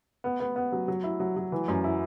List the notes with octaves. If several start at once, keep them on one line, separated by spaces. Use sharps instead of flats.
B3
B3
B3
F#3
F#3
E4
F#3
F#3
E3
F#2
E4